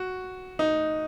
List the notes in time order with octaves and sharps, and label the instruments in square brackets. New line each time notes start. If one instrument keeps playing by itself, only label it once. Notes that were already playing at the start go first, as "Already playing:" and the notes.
Already playing: [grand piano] F#4
D#4